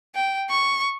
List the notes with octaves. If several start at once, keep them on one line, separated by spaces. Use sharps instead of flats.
G5
C#6